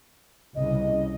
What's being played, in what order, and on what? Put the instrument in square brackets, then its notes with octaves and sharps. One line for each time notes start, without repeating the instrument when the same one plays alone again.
[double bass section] C2 A#2 C#3 [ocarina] D#5